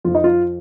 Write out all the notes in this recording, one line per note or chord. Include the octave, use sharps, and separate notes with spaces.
F2 F3 F4
D#4
F4